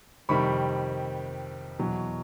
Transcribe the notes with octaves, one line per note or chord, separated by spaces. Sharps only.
F2 C3 D#3 G3 B5 C#6
E2 B2 F#3